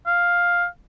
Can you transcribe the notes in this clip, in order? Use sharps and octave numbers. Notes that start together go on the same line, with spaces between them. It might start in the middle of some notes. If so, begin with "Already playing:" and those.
F5